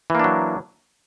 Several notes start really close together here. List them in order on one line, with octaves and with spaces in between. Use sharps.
E3 A#3 D4 F#3